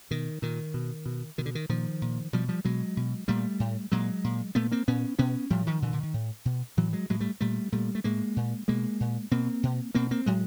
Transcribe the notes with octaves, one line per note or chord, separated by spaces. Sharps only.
B2 D#3
A#2 D#3
B2
B2
B2 D#3
D3
D#3
A#2 D#3 F3
A#2
B2 F3 G3
F3 G3
B2 F#3 G#3
B2
A#2 G3 A3
A2
A#2 F#3 G#3
A#2
A#2 A3 B3
A#3 C4
A#2 B3 C#4
B2 B3 C#4
A2 F3 G3
D#3 F3
A#2 D3 E3
D3
D#3
A2
B2
A2 E3 F#3
F#3 G#3
A2 F#3 G#3
G3 A3
A#2 G3 A3
A#2 G3 A3
A3
A2 G#3 A#3
A#2
B2 G#3 A#3
A#2
B2 A#3 C4
B2
B2 A#3 C4
A#3 C4
A2 F#3 G#3